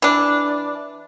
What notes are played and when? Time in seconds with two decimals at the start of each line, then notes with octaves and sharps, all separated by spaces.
0.02 E3 D4